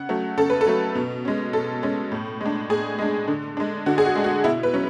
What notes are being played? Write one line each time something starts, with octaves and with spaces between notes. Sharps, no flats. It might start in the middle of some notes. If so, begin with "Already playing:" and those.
Already playing: C#3 F#5
F#3 A3
C#3 A4
B4
A4
F#3 A3
B2
G#3 C#4
B2 A4
G#3 C#4
A2
G#3 D4
A2 G#4
G#3 D4
D3
G#3 D4
D3 F#4
G#4
F#4
G#3 D4
F#4
B2 E4
B4
F#3 C#4